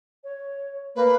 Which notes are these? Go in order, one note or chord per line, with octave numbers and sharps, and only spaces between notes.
C#5
A#3 B4